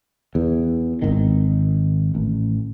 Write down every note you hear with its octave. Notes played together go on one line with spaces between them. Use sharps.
E2
G#1 D#3
A1